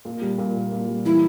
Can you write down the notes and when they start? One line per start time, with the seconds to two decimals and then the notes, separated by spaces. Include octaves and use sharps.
0.05 A#2
0.22 G3
0.38 A#2
0.56 A#3
0.72 A#2
0.88 G3
1.06 E3 E4